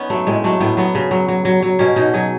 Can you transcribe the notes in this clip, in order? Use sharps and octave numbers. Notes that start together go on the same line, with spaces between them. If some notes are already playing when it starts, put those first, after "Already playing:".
Already playing: B3 C#4 D#4
F#3 A3
A2 G#3
F#3 A3
A2 B3
F#3 B3
C#3
F#3
F#3
F#3
F#3
B2 C#4
B2 D#4
F#3 G#4